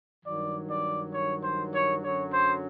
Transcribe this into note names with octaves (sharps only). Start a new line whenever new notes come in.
G2 D#3 F#3 D5
D5
C#5
C5
C#5
F#2 D3 F#3 C#5
C5